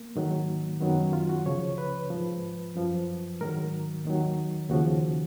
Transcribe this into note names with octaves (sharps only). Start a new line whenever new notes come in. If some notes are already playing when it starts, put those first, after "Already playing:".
Already playing: A#3
G#2 D#3 F#3
F#2 D#3 F#3 B3
C#4
F4
F#4
C#2 C#3 F3 C#5
B4
G#2 F3
F#2 F3
G#2 D#3 F#3 A#4
D#2 D#3 F#3
D#2 C#3 F3 F#4